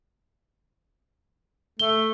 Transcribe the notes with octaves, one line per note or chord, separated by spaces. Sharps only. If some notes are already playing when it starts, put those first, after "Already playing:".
A3 G7